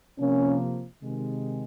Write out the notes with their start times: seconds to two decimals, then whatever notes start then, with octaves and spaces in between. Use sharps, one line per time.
0.18 C3 F3 A#3 C#4
1.02 C3 D#3 G#3